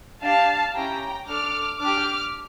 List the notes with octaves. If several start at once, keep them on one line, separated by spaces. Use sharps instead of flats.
D4 G4 F5 A5
C#4 E4 G4 G5 A#5
D4 A4 D6 F6
D4 G4 D6 F6